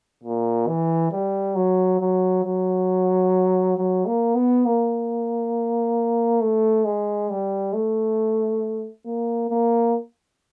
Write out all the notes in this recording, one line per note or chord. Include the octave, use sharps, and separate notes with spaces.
A#2
E3
G3
F#3
F#3
F#3
F#3
A#3
B3
A#3
A3
G#3
G3
A3
A#3
A#3